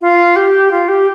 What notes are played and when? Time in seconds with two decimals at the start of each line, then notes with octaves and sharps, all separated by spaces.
0.01 F4
0.36 G4
0.71 F4
0.88 G4